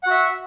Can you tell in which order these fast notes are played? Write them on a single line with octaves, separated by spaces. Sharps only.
F#5 F#4 E5